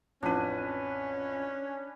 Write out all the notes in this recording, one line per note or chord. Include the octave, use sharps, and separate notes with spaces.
A1 F2 C#4 D4 B4